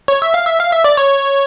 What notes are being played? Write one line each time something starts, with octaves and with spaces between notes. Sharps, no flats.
C#5
E5
F5
E5
F5
E5
D5
C#5